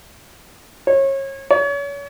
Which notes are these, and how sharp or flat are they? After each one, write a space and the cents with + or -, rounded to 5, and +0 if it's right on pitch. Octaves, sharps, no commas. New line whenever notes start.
C#5 -30
C#5 +35